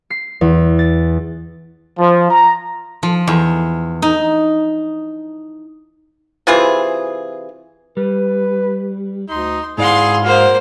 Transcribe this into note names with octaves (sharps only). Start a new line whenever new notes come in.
C7
E2
A6
F3
A#5
F3
E2
D#4
C3 E3 F4 G#4
G3 B4
D2 D#4 C6
G#2 E4 G#4 D5 F5 F#5 C6
A#3 F#4 C5 F5